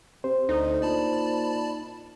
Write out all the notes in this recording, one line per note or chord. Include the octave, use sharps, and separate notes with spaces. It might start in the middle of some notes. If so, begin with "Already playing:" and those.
C3 C5
D2 D3 D#4
A#2 D5 A5 B5